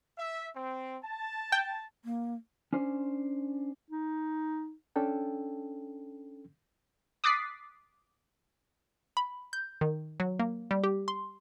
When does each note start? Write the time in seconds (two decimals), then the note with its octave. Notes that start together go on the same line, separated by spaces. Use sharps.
0.18 E5
0.56 C4
1.04 A5
1.52 G5
2.05 A#3
2.73 C#4 D4 C5
3.90 D#4
4.96 C#4 D4 A4 G5
7.24 D6 D#6 F#6 A6 B6 C7
9.17 B5
9.53 G6
9.81 D#3
10.20 F#3
10.39 A#3
10.71 G3
10.84 G4
11.08 C6